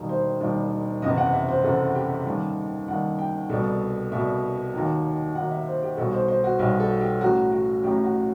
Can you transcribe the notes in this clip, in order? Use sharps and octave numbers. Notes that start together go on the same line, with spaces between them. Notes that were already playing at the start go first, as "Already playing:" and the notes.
Already playing: E1 D#2 D#3 G3
C5
E1 D#2 D#3 G3
F#1 E2 C3 D#5
F#5
E5
C5
F#1 E2 C3 A4
G4
D#2 D#3 G3
D#2 D#3 G3 F#5
G5
C2 B2 G3 A4
C2 B2 G3 E5
D#2 D#3 F#3
D#2 D#3 F#3 F#5
E5
C5
G4
B1 B2 G3 A4
C5
C5
F#4
B1 B2 G3 G4
A4
G4
A1 A2 F#3 F#4
F#4
A1 A2 F#3 G4
F#4